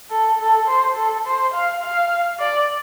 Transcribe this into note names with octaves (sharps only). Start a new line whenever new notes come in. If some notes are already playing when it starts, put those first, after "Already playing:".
A4
A4
C5
A4
C5
F5
F5
D5